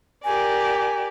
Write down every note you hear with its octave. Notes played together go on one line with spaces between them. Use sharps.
G4 A#4 D5 G#5